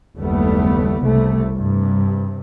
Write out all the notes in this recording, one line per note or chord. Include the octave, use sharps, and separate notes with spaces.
F#1 D#2 G3 A3 B3
C2 C3 A3
G2 C3